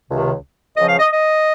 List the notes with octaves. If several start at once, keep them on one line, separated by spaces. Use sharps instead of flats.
C#2 C3 D#3
C#2 C#3 F3 D#5
F5
D#5
D#5